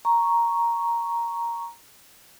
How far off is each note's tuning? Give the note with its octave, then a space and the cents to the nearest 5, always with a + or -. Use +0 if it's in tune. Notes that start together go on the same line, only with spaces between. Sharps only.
A#5 +0 C#6 +0